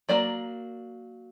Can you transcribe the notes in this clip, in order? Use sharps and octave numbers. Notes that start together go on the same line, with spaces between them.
F#3 A#3 D5